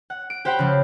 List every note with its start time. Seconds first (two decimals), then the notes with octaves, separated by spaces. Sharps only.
0.10 F#5
0.30 D7
0.45 G4 C5 F#5 G5 B5
0.59 C#3 F3